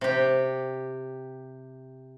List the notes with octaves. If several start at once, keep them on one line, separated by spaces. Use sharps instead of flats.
C3 G4